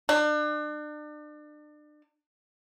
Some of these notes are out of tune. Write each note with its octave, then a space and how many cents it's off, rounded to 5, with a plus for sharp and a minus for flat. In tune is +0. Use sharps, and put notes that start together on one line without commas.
D4 +35